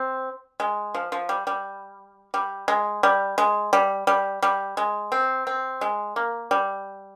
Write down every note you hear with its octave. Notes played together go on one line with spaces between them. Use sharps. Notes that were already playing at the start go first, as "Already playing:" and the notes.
Already playing: C4
G#3
F3
F3
G3
G3
G3
G#3
G3
G#3
G3
G3
G3
G#3
C4
C4
G#3
A#3
G3